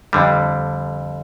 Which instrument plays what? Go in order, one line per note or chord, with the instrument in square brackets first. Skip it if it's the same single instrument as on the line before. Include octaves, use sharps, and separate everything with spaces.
[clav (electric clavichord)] F2 D3 G3